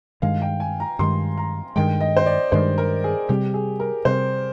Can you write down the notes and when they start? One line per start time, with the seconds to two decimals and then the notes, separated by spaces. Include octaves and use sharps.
0.22 G2 D#3 G#3 F5
0.42 G5
0.60 G#5
0.80 A#5
0.99 G2 D#3 G#3 C6
1.38 A#5
1.76 G2 D#3 G#3 G5
2.01 D#5
2.17 C5
2.26 D5
2.52 G2 D#3 G#3 C5
2.78 A#4
3.04 G#4
3.29 C3 G3 C4 G4
3.54 G#4
3.80 A#4
4.05 C3 G3 C4 C5